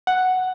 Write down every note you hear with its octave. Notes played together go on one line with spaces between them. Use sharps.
F#5